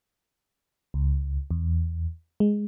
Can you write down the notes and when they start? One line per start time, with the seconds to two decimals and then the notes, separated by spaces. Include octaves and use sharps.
0.94 C#2
1.51 E2
2.40 G#3